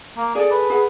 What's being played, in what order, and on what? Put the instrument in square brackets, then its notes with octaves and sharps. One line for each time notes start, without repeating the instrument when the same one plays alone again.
[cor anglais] A#3
[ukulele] G#4 A4 [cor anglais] D5
[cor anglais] B4
[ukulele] G#4 F#5